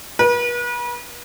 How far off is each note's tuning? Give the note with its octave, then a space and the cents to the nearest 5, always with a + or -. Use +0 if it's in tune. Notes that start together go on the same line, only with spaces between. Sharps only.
B4 -40